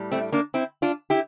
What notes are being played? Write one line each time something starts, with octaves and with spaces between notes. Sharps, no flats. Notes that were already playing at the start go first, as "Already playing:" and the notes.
Already playing: A2 G3
A3 C4
A#3 D4
C4 E4
D4 F4
E4 G4